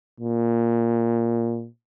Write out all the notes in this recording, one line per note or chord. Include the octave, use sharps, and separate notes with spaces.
A#2